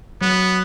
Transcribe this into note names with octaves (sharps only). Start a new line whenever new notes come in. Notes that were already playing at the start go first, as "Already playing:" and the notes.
F#3 B3